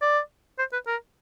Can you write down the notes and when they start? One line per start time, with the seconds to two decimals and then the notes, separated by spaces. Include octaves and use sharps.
0.02 D5
0.59 C5
0.73 B4
0.87 A#4